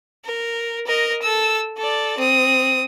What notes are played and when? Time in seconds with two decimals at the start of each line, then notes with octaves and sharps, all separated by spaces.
0.25 A#4
0.87 A#4 D#5
1.22 A4 E6
1.77 A4 D5
2.18 C4 D#6